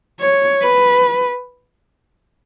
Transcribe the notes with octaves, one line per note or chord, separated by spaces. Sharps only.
C#5
B4